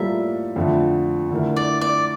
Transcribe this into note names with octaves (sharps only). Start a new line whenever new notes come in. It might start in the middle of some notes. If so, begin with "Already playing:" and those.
Already playing: A2 G3 A#3 F4 A4 E5
F2 D3 A3
D3 A3 E4 A#4
D5
D5